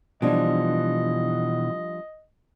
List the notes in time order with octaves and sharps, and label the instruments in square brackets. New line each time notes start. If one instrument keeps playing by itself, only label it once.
[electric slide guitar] B2 E3 [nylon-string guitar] F3 G3 D4 [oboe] D#5